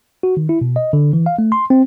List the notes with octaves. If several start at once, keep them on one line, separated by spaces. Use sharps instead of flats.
F#4
D#3
E4
B2
D#5
D3
E3
F5
A3
C6
C4